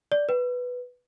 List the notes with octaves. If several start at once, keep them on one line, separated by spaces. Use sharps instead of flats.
D5
B4